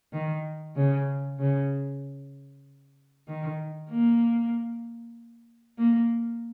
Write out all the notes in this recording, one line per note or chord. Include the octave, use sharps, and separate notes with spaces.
D#3
C#3
C#3
D#3
A#3
A#3